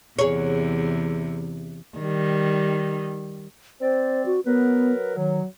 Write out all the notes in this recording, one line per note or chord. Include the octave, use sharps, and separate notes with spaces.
E2 C3 G#4 C#5
D#3 G3
C4 C5 D5
F#4
F#3 B3 A#4 B4
D#3 F#3